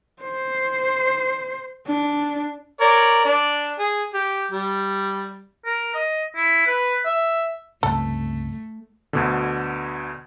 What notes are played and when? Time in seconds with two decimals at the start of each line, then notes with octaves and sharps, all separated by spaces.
0.22 C5
1.87 D4
2.80 A#4 C#5 D5
3.25 D4 D5
3.79 G#4
4.14 G4
4.52 G3
5.66 A#4
5.94 D#5
6.36 E4
6.66 B4
7.06 E5
7.83 C#2 G2 C3 A3 A4
9.13 D2 B2 D3